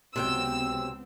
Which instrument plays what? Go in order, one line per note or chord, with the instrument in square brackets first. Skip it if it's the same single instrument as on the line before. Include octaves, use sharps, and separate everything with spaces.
[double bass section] C#2 B3 C4 [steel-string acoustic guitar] C3 F#3 G5 [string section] E6